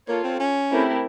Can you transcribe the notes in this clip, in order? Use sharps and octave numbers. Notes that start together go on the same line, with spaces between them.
A#3 F4 A4 C#5
C4
C#4
A3 C4 E4 G4 A#4